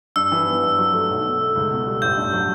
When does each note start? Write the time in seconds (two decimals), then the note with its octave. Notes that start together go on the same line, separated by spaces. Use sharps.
0.16 G2 E6
0.32 E3
0.46 B3
0.62 G2
0.78 F#3
0.93 A3
1.09 B1
1.25 B2
1.40 A3
1.55 C#2
1.70 B2
1.86 G3
2.02 A1 G6
2.17 G2
2.33 F#3